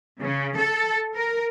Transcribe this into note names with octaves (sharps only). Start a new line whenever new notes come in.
C#3
A4
A#4